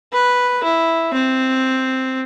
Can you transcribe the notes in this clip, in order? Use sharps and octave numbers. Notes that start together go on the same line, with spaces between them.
B4
E4
C4